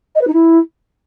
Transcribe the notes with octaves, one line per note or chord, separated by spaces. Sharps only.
D#5
B4
D#4
E4